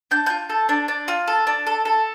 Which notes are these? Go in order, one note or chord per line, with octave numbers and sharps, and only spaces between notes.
D4 G6
F4 G6
A4
D4
D4
F4
A4
D4
A4
A4